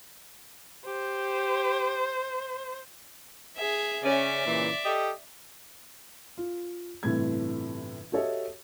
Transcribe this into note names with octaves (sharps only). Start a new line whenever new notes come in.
G4 C5
G#4 E5
C#3 C#4 D5 E5
A#2 C#3 E3
G4 A4 D#5
F4
G1 A2 C3 E3 A3 G#6
F#4 G4 A4 C#5 D#5 E5